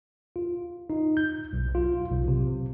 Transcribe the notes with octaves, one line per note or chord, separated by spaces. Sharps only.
F4
D#4
G6
B1
F4
B1
C3